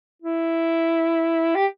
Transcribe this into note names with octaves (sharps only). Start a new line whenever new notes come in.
E4
G4